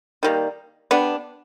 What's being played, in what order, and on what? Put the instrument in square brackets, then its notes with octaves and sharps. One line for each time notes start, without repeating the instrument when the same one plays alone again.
[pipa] D#3 G3 A#3
G3 B3 D4